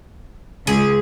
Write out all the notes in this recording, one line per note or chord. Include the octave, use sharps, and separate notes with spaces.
C#2 G#4